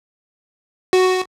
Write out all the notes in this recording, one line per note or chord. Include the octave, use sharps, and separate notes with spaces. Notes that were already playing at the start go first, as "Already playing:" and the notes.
F#4